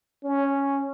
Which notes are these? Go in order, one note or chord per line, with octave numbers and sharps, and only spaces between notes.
C#4